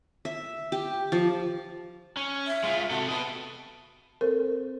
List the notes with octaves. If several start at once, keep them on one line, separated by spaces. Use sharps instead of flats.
E5
G4
F3
C#4
E5
G#3 F4
C3 F#4 A4
B3 D#5 A5
C4 A4 A#4 C5